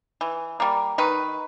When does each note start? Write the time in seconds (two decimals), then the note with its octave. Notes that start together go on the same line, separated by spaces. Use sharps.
0.21 E3
0.60 G3 A#3
0.98 D#3 B4